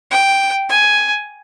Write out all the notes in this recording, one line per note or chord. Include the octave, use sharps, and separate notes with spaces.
G5
G#5